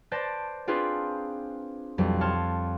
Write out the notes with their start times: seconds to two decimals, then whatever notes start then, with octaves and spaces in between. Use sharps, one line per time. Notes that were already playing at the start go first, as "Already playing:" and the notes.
0.11 B4 C5 D5 A5 A6 A#6
0.67 C4 D4 F4 G#4 B4 C5
1.98 B1 F2 G3
2.21 C#5 A5 C6 F6 G#6